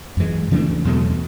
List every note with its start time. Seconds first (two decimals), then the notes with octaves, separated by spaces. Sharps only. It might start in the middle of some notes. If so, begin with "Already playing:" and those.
0.17 F#2 E3 G#3
0.51 C#3 E3 A3 D4
0.85 E2 B2 F#3 A3